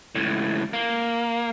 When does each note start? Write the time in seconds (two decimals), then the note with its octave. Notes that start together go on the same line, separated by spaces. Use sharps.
0.15 C#2 A2
0.73 A#3